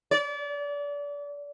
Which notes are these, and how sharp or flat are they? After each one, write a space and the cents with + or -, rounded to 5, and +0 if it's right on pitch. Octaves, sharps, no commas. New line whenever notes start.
D5 -30